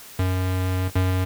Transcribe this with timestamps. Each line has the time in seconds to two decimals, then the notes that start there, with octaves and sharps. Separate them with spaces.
0.19 F#2
0.96 F#2